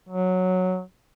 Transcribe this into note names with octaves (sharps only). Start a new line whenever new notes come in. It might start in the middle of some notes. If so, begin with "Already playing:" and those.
F#3